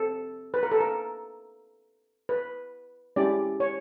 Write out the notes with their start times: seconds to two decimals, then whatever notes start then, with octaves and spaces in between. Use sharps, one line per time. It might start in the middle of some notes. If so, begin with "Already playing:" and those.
Already playing: C4 A4
0.54 B4
0.63 A#4
0.72 A4
0.80 A#4
2.29 B4
3.16 G#3 C#4 E4 G4 D5
3.60 C#5